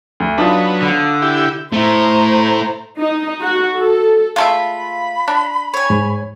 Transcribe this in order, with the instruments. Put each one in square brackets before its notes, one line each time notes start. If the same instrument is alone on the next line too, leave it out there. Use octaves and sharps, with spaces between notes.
[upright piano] D2
[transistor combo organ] F#3 B3 [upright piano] D4 D#4 F4
[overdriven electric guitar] D3
[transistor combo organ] E4 G4
[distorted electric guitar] A3 E4 [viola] C5 A#5
[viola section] D#4
F#4
A4
[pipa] G#3 A3 E5 [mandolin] F4 [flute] B5
[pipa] D4
[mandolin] C#5 G#5
[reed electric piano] G#2